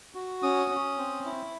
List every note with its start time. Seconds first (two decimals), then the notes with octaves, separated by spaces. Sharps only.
0.15 F#4
0.43 C#4 D#6
0.71 C#4
0.98 C4
1.25 E4